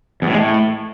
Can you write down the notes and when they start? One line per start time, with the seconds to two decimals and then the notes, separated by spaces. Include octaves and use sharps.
0.22 E2
0.27 A2
0.33 G#3
0.38 A2